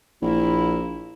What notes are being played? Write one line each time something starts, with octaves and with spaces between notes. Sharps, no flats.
A#1 A#3 E4